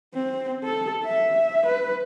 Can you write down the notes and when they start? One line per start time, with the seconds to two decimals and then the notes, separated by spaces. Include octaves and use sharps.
0.14 C4
0.64 A4
1.04 E5
1.66 B4